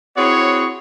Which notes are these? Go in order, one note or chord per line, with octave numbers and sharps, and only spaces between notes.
C4 E4 F#4 G#4 C#5